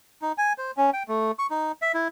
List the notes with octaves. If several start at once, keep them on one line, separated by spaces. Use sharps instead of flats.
D#4
G#5
C5
C#4
G5
A3
C#6
D#4
E5
E4